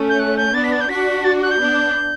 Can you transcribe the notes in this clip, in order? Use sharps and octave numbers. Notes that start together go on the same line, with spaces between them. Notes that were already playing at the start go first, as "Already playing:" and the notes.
Already playing: A3 C#4
G6
F#6
G6
B3 D4 A6
B6
A6
G6
D4 F#4 B6
A6
F#6
G6
B3 D4